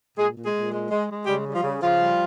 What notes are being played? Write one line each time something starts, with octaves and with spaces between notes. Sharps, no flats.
A#2 G#3 G#4
A#2
G#3 G#4
A#2
G#3
G#3
G#3
C#3 G3 G4
G3
F3 F4
C#3
C#3 F3 F4
G3